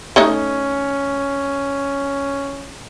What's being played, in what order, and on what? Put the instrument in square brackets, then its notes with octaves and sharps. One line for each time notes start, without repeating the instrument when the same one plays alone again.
[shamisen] A3 D#4 D#5 [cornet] C#4